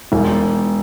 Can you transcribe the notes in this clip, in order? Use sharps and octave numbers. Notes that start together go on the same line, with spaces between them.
E1